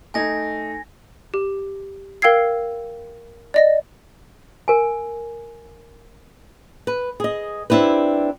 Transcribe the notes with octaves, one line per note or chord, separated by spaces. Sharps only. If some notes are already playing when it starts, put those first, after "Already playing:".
A3 D#4 G#5 G#6 A#6
G4
A#4 F5 G5 E6 G#6 C7
D5 D#5 A#6
A#4 G#5
B4
G#4 D#5
C4 D4 E4 G4 B4